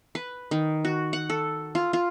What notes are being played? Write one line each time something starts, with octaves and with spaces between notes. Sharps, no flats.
B4
D#3
F#4
F#5
A4
F4
F4